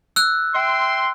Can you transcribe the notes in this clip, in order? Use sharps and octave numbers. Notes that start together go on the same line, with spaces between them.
E6 F#6
E5 G5 C6